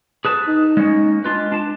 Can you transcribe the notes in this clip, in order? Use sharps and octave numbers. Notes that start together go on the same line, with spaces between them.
G#4 B4 A5
D#4
G#3 A#3 C#4
G#3 D4 F4 B4
D4 A5